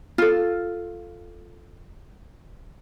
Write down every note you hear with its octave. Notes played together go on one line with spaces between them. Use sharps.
F4 A4